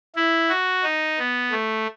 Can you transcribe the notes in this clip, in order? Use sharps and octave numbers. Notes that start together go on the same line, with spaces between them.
E4
F#4
D#4
B3
A3